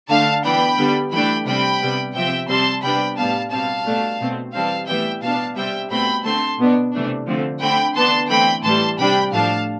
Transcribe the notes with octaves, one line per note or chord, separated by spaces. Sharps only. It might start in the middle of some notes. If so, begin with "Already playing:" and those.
D3 A3 D4 F5 A5
E3 B3 D4 G5 B5
D3 G3 B3
E3 A3 D4 G5 B5
C3 G3 C4 G5 B5
C3 G3 B3
C3 F3 C4 E5 G5
C3 G3 C4 A5 C6
C3 G3 B3 D4 G5 B5
A2 G3 B3 F5 A5
B2 G3 C4 F5 A5
B2 A3 D4
B2 A3 C4
E3 G3 C4 F5 A5
A2 E3 G3 B3 E5 G5
B2 B3 D4 F5 A5
C3 G3 C4 E5 G5
B2 A3 C4 G5 B5
D3 A3 C4 A5 C6
B2 B3 D4
C3 E3 A3 D4
D3 F3 A3 C4
D3 A3 C4 G5 B5
E3 B3 D4 A5 C6
E3 A3 C4 G5 B5
A2 E3 G3 A5 C6
C3 G3 D4 G5 B5
A2 F3 A3 D4 F5 A5